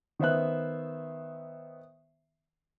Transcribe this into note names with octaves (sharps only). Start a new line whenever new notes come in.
D#3 B3 C5 E5 F#6